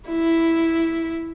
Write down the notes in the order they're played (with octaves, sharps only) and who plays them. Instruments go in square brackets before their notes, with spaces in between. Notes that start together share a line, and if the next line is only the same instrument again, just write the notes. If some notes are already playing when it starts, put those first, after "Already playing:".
[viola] E4